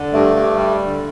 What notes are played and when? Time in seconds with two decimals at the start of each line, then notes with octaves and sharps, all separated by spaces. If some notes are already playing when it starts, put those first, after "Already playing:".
Already playing: D3
0.13 G2 A3
0.35 G2
0.56 G3
0.78 D3